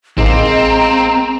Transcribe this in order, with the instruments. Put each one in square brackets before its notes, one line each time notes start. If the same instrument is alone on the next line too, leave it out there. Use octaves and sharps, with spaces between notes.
[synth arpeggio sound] A1 [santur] G#3 A#3 [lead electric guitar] C4 [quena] A#5